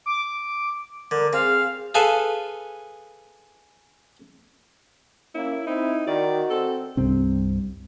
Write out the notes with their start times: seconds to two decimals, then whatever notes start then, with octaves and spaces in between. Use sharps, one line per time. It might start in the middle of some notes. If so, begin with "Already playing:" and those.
0.06 D6
1.11 D3 A#4
1.33 C4 G#4 F5
1.95 G#4 A4 B4 F5 G#5 A5
5.35 A#3 C#4 E4
5.67 C4 D#4 E4
6.07 D#3 F#4 D5
6.50 C4 A4
6.97 C2 G2 C3 C4